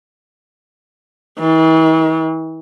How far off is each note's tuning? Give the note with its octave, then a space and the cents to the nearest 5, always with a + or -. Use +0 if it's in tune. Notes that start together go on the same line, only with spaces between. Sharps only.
E3 -45